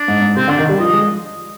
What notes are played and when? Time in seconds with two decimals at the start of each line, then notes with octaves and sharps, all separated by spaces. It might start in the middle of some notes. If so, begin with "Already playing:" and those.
Already playing: D4
0.08 G#2
0.22 G#2
0.36 C3 C4
0.48 D3
0.50 D4
0.59 D#3
0.69 G3
0.80 F3 D#5
0.93 G#3